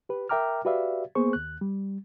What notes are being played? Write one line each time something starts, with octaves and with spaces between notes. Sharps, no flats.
G4 B4
A#4 E5 G5 A#5 D6 F6
F#4 G4 B4 D5 E5 F5
A#3 B3 G#4 C5 C#6
D#2 F#6
G3